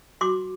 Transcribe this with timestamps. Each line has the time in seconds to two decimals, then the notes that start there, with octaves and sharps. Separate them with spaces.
0.21 F#4 C6 D6